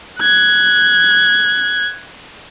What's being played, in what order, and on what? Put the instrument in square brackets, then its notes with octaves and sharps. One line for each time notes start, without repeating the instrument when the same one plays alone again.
[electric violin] F#6 G#6